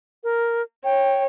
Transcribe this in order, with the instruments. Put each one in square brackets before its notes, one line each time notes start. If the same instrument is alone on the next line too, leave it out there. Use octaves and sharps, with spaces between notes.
[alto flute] A#4
[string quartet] C#5 [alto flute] G5